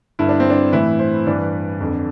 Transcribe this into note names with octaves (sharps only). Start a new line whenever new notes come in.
G2 D3 E4
D4
C4
D4
A2 E3 E4
C5
G2 E3 D5
F2 D3